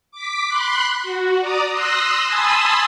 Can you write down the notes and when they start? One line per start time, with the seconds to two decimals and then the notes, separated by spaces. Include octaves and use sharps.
0.12 D6 B6
0.49 B5 C6 F#6
1.03 F#4
1.40 D5 A#5 D#6
1.72 C6 D#6 E6 F#6 A#6
2.27 G#5 A5 B5 C6 D#6 E6